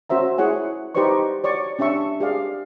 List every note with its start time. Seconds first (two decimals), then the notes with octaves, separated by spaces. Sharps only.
0.10 C#4 F#4 C5 E5 A#5
0.38 E4 G#4 C#5 F#5 G#5
0.95 D#4 G4 B4 C5 D5 C#6
1.44 C#5 D5 C#6
1.79 C#4 D4 G4 E5 C#6
2.20 G4 G#4 D5 F5